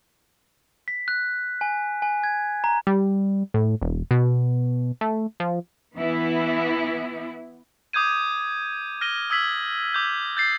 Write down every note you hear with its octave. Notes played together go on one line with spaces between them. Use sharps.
B6
F#6
G#5
G#5
G#6
A#5
G3
A2
E1
B2
A3
F3
E3 B3 E4
D6 D#6 G6 G#6 D#7
F6 A#6 D#7 G7
D#6 E6 G#6 B6 F#7
D6 G6
G6 A6 C7